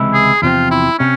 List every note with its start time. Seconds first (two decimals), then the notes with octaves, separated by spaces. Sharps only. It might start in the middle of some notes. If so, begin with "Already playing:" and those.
Already playing: C#2 C3 E3 G#3 E4
0.14 G#4
0.42 E2 C3 F3 C4 F4
0.71 E4
0.99 C3 C#4